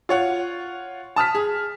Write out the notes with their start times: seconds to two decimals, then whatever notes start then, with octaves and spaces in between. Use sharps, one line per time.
0.09 F4 C#5 F#5
1.16 A5 D#6 F6 B6
1.35 G#4